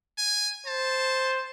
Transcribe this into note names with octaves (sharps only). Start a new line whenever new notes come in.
G#5
C5 A5